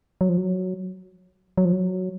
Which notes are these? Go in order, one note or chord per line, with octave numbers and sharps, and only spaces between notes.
F#3
F3
F#3
F#3
F3
F#3